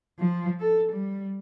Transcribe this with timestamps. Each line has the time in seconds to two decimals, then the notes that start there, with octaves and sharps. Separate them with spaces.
0.19 F3
0.60 A4
0.92 G3